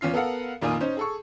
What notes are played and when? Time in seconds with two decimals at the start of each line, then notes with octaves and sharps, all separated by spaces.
0.01 E2 C#4 F4 C7
0.14 B3 A4 A#4 F5 F#5
0.61 F1 A#2 D#3 F4 G#5 D#6
0.81 C#4 D#4 C5
0.97 G#4 A4 C#6